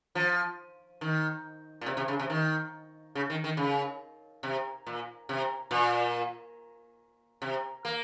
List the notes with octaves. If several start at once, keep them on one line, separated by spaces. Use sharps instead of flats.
F3
D#3
A#2
C3
C3
C#3
C3
D#3
C#3
D#3
D#3
C#3
C3
A#2
C3
A#2
C3
A#3